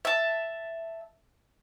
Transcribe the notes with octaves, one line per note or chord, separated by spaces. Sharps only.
E5 A5